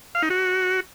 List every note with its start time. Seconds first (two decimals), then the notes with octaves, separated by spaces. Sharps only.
0.15 F5
0.22 D#4
0.30 F#4